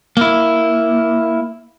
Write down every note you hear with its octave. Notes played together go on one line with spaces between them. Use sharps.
A#3 E4